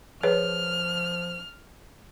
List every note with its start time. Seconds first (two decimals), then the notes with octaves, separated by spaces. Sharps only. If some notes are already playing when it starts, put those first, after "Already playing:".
0.23 F3 G#4 B4 C#5 F6